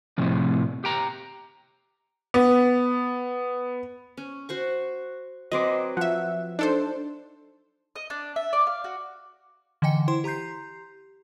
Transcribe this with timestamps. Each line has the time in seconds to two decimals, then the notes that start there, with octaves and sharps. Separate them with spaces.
0.18 A2 C3 F3
0.84 G4 G5 A#5
2.34 B3
4.17 C#4
4.49 F#4 C5 C#6
5.52 F#3 C4 B4 D#5 C6 D6
5.97 F3 E5 F#5
6.59 D4 D#4 A4 C5
7.96 D#5
8.10 D4
8.36 E5
8.53 D5
8.67 F5
8.84 F#4
9.82 D3 E3 D#5 G5 C#7
10.08 E4 C5 C6
10.24 G4 A#5 C6 G6 C7